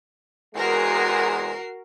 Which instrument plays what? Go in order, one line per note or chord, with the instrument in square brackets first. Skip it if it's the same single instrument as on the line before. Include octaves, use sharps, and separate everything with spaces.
[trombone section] E2 C3 G#3 [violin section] F#4 A#4 C7